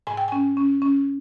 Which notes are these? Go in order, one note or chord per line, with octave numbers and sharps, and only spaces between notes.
G#2 G#5
G5
C#4 G#5
C#4
C#4